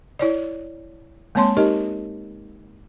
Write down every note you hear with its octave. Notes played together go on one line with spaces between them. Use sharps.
E4 C#5 D5
G#3 A#3 C4 C#5 A5 C6
D#4 G4 A#4 D#5